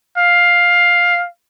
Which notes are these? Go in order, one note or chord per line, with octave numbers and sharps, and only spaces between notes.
F5